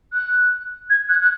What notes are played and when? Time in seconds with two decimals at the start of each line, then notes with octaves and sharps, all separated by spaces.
0.13 F#6
0.90 G#6
1.09 F#6
1.22 F#6